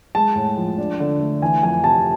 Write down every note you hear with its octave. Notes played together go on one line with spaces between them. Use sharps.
G#3 A5
A2
F3
D4
D3
A3
E3 G#5
F2 G#5
C3 A5